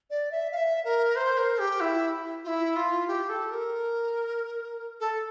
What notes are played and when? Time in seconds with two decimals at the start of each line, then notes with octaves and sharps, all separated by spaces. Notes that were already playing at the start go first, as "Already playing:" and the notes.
0.10 D5
0.31 E5
0.52 F5
0.56 E5
0.84 A#4
1.16 C5
1.38 A#4
1.59 G4
1.80 E4
2.44 F4
2.48 E4
2.76 F4
3.07 G4
3.29 A4
3.51 A#4
5.00 A4